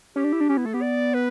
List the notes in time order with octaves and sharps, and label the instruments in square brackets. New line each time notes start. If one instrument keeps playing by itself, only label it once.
[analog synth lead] C#4 [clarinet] G4
[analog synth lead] D4
E4
D4
[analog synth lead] C#4 [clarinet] G4
[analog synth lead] B3 [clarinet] E4
[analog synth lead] A3 [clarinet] A4
[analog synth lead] B3 [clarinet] G4
[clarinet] D5
B4